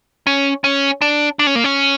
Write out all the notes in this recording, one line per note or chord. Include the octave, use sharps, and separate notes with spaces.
C#4
C#4
D4
D4
C#4
A#3
C#4